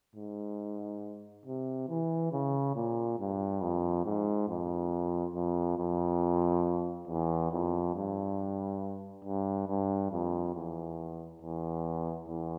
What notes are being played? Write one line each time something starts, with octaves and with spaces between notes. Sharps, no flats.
G#2
C3
E3
C#3
A#2
G2
F2
G#2
F2
F2
F2
E2
F2
G2
G2
G2
F2
E2
E2
E2